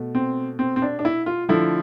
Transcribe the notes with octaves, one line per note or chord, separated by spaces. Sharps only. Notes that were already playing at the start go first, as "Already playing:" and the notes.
Already playing: B2 A3
C4
C4
C4
D4
D4
E4
F4
D3 F3 A3 E4